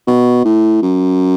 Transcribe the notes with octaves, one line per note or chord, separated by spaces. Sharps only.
B2
A2
F#2